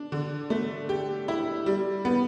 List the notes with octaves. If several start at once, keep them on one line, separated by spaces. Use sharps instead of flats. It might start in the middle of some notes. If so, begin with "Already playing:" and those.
Already playing: D4
D3
A3
G4
E4
G3
B3